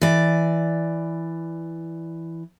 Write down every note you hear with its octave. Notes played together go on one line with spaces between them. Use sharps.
E3 D5